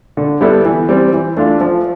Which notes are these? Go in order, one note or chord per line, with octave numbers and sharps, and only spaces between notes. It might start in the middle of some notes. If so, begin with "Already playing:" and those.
D3
G3 B3 E4 A4
E3
G3 C4
E3
A3 D4 F4
F3